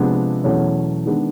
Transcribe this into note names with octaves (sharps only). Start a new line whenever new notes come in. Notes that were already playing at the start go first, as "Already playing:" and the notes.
Already playing: C3 F3 G#3 B3 D4
E2 B2 F#3 A3 C#4
D#3 G#3 B3 D4